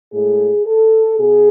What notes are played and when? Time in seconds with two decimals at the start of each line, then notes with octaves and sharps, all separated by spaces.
0.13 A2 G#3 G#4
0.66 A4
1.19 B2 G#4